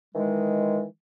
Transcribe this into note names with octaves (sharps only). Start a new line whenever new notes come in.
D#3 E3 G#3